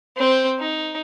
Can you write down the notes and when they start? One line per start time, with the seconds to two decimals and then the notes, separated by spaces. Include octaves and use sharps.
0.17 C4 C5
0.59 D#4